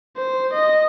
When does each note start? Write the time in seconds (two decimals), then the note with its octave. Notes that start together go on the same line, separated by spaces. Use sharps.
0.17 C5
0.53 D#5